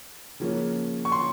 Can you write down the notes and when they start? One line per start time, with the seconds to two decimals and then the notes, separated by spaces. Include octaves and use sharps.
0.40 C#3 F3 A#3 C#4
1.05 C#6
1.12 C6